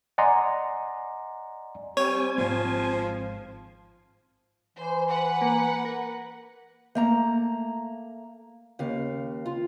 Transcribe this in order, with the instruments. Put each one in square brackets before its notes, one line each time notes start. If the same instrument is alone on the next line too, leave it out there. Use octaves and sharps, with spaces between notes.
[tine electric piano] D5 D#5 F#5 G#5 A#5 C6
[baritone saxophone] G3 [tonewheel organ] C4 G#5 [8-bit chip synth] C#5
[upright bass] G#1 [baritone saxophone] F3
[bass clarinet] E3 [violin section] C5
[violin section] B4 F#5
[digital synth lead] A#3
A#4
[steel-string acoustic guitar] A3 A#3 A#5
D#2 C#3 F5
F4